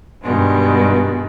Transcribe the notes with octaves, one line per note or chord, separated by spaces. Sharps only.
G2 B2 D#3 G3 G#3